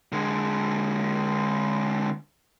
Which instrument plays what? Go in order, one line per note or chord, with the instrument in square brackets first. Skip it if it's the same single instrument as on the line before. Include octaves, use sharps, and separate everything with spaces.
[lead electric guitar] D3 G#3